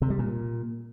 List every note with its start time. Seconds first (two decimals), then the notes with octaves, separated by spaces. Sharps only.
0.02 C3
0.10 G3
0.19 A#2